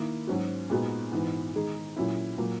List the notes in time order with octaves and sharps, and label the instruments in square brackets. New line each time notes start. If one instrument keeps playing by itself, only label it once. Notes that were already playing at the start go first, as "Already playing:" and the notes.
Already playing: [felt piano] D#3 A#3 E4
G#2 F#3 C#4 F#4
A#2 G#3 B3 D#4 F#4
G#2 E3 B3
D#3 G#3 D#4 G#4
A#2 F#3 C#4 E4
A#2 F#3 A#3